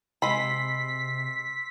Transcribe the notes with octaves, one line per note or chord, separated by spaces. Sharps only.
C3 G#3 B5 C6 E6 B6 C7